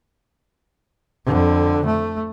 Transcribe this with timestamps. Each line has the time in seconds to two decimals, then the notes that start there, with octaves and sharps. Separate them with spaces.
1.25 F2 D3
1.86 A3